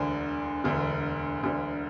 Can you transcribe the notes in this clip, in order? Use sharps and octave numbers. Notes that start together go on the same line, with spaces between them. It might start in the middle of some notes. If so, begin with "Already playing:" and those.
Already playing: E1 D2 D3
E1 D2 D3
E1 D2 D3